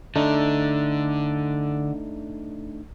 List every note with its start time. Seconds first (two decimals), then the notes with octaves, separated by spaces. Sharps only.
0.15 D3 A3 D4 D#4